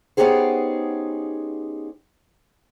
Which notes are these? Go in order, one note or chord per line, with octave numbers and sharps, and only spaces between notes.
B3 C#4 D#4 G4 G#4 C5